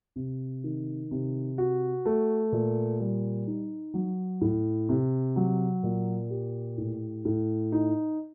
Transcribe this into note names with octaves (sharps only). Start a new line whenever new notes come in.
C3
D#3
C3
F#4
A3
A#2
G3
D#4
F#3
A2
C3
F#3
A#2
G4
A2
A2
D#4